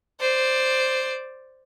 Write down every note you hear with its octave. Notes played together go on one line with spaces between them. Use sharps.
C5 D5